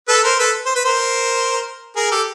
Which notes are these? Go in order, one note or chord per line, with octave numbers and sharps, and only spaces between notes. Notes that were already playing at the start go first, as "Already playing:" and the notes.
A4 B4
A#4 C5
A4 B4
C5
B4
A#4 C5
G#4 A#4
G4 A4